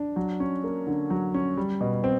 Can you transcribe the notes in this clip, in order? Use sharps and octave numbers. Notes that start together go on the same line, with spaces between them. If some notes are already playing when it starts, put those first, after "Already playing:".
Already playing: D4
F#3
C#4
A#3
D3
F#3
C#4
G3
B2
C4